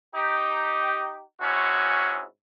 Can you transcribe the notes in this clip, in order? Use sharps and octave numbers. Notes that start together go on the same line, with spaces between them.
D#4 G4
G#2 C3 C#4 E4 F#4